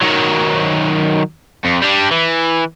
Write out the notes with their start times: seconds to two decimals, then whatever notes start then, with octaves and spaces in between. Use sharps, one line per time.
0.01 D#3 F#3
1.64 F2
1.82 G3 D4
2.11 E3